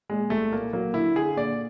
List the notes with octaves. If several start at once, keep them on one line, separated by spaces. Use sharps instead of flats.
A#2 G#3
C2 A3
A#2 A#3
F#3 A#3
D3 E4
D3 G#4
A#2 D5